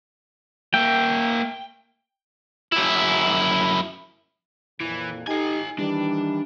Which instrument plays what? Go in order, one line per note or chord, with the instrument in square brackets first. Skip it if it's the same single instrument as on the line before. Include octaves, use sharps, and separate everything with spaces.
[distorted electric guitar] A#3 E5 [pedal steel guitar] G5
[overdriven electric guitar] F#2 E4
[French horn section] F2 A#2 [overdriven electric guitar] E3
[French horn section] D#4 G4 [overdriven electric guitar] A4 G#5
[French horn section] D#3 E3 G3 [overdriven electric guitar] D4